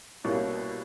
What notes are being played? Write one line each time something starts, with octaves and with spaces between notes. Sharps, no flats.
C2 B2 G3 A#3 C#4